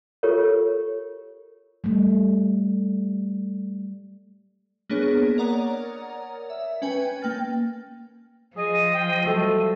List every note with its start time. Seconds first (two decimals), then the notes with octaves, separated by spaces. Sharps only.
0.23 F4 G4 A4 A#4 C#5
1.84 G3 A3
4.90 A#3 B3 D4 G#4 C#5
5.38 A#4 C#5 D5 F#5 A#5 D#6
6.50 E5
6.82 C#4 B4 G5 G#5
7.22 A#3 G5 F6 A6
8.57 F3 G#4 D#5
8.94 G5
9.24 F#3 G3 A3 A4